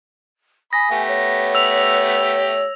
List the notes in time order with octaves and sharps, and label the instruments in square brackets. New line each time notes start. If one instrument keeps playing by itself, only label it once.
[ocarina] G#5 [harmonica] B5 D#6 [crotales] A#6
[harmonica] A3 B3 G4
[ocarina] C#5
[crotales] E6 F7